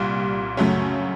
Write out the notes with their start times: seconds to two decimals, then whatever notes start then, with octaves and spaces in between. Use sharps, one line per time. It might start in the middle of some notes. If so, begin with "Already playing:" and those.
Already playing: C2 A#2 G3
0.57 F#2 C#3 F#3 A3 C#4